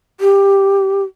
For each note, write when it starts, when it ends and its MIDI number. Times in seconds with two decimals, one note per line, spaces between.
0.20 1.03 67